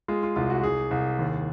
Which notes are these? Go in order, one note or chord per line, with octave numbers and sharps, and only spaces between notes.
G#3 F4
F4
C2 F4
F#4
C2 G#4
C2
D#2